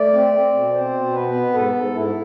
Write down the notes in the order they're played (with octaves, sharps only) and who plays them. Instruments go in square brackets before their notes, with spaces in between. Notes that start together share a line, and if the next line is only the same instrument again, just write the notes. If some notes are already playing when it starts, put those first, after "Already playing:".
Already playing: [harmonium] A3 D5
C4
C4
B2
C4 C5
B2
B3 B4
B3
G#2 A4
G#2
G#2 E4